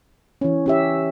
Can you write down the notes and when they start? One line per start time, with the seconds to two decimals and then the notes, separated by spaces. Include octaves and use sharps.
0.41 E3 C#4
0.66 C#4 G4 E5